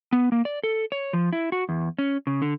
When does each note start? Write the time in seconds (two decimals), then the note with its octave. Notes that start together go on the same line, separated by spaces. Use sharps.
0.13 B3
0.32 A#3
0.45 D5
0.64 A4
0.92 C#5
1.13 F3
1.33 E4
1.52 F#4
1.69 E2
1.99 C#4
2.27 C#3
2.42 D3